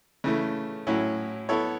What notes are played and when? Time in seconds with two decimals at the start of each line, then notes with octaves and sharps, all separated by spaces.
0.24 C#3 E3 A3
0.87 A2 F#3 C#4 E4
1.49 B3 E4 A4 C#5